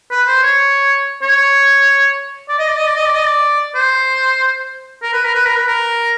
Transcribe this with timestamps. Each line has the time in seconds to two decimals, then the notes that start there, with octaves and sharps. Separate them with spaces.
0.10 B4
0.27 C5
0.43 C#5
1.22 C#5
2.49 D5
2.59 D#5
2.68 D5
2.77 D#5
2.87 D5
2.96 D#5
3.06 D5
3.15 D#5
3.25 D5
3.75 C5
5.03 A#4
5.13 B4
5.24 A#4
5.35 B4
5.46 A#4
5.56 B4
5.68 A#4